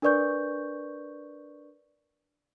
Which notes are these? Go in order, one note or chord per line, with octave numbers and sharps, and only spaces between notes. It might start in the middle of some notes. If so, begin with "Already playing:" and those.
D4 A#4 B4 D5 C#6 G6